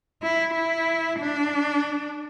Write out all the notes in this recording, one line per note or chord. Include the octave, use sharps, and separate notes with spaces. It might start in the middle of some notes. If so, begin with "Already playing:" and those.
E4
E4
D4